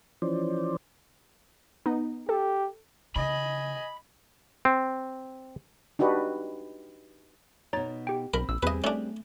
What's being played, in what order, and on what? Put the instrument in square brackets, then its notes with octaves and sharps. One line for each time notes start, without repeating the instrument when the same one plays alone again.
[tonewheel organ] E3 F3 C#4 C5 D5
[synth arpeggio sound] B3 D#4
[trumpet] G4 [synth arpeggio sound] A4
[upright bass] C#3 [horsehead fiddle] D#5 G#5 [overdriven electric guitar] B5
[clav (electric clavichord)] C4
[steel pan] D4 D#4 F#4 G4 B4
[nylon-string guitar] B2 D#4 [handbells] C#5 A#5 A6
[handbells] G4 G5
[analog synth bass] B1 [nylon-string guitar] C4 [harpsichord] A#4 [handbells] B5
[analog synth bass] A#1 [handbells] E6
[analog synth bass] E2 [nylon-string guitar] G3 C4 G#4 [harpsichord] B4 D#5
[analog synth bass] A3 [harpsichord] C#4 D4